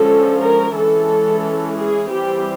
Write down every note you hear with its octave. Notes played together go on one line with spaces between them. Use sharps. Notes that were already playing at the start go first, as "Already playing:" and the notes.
Already playing: D3 F3 G#3 C#4 A4
A#4
E3 G#3 C#4 A4
G#4
E3 G3 C4 G4